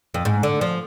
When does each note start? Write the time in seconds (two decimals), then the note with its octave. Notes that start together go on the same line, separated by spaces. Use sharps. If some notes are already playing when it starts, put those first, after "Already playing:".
0.14 F2
0.25 G#2
0.43 D3
0.61 F3